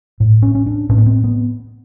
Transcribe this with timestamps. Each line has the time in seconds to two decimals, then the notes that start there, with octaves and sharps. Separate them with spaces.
0.20 A2
0.42 C#4
0.55 C#4
0.66 D4
0.89 A2 C#4
0.98 B3
1.06 C4
1.24 B3